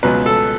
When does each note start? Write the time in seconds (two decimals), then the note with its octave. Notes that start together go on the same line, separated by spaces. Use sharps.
0.03 C#2 B2 F#3 B4
0.26 A4